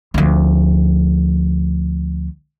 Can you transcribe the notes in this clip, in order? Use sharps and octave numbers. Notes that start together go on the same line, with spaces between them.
D2 F3